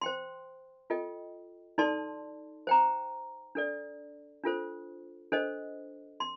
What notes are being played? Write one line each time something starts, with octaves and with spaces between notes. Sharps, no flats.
C5 G5 C6
F4 A4 D#5 G5
D#4 A4 D5 A5 C6
C5 G5 A#5
D4 A4 D5
D4 F4 A4 C5
D4 A4 C5 D#5
C6